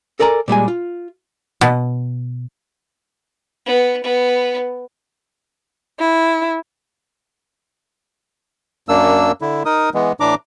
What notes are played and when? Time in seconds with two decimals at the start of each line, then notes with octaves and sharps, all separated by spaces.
0.19 A4 A#4 D5 G#5 A#5
0.48 A#2 G3 G#3 G#5
0.68 F4
1.61 B2
3.66 B3
4.03 B3
6.00 E4
8.89 F#2 A#3 D4 E6
9.41 D3 E4
9.65 D#4 A#4 D#6
9.94 E3 G#3 B3
10.20 A2 E3 D4 A#5 D6